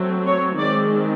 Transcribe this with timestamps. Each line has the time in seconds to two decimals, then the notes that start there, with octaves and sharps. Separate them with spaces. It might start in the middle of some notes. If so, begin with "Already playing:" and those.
Already playing: F#3 A3 C4
0.26 C#5
0.59 D#3 G#3 C4 D5